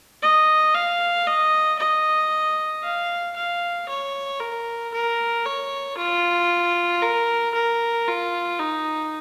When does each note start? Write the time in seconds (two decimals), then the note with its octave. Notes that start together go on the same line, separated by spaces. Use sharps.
0.22 D#5
0.74 F5
1.27 D#5
1.79 D#5
2.83 F5
3.36 F5
3.89 C#5
4.40 A#4
4.93 A#4
5.46 C#5
5.97 F4
7.02 A#4
7.54 A#4
8.07 F4
8.60 D#4